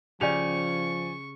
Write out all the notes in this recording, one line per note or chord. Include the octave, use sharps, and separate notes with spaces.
C#3 F3 G4 D5 G#5 C#6 F7